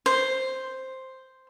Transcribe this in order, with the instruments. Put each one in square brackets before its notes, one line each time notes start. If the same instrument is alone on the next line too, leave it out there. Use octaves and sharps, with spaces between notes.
[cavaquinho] C5